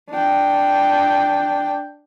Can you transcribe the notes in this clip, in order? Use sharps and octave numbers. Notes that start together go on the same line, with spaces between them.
D4 G5